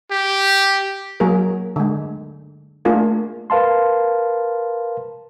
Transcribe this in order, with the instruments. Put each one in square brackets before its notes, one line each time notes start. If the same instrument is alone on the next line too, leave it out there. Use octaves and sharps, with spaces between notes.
[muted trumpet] G4
[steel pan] F#3 A#3 G#4 A#4
D3 G#3
A3 A#3 D4 F4 G#4 A#4
[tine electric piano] A#4 B4 F5 A5 C6